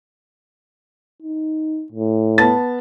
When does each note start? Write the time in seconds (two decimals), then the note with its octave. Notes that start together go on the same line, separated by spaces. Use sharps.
1.23 D#4
1.92 A2
2.38 B3 A5 A6